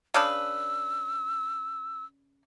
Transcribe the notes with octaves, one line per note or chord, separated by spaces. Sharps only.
C#3 D4 B4 E6